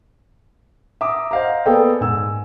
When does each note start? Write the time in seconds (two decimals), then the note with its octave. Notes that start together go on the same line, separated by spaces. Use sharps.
1.01 E5 A#5 D6 D#6
1.31 C5 D#5 F5 F#5 A#5
1.66 A#3 B3 G#4 A4 D5 G5
2.01 G#2 G#5 E6